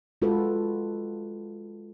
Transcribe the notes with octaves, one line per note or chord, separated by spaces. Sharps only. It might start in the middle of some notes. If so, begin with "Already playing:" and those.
G#3 F4 F#4 A4 B4